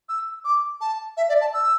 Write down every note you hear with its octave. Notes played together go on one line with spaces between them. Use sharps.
E6
D6
A5
E5
D5
A5
E6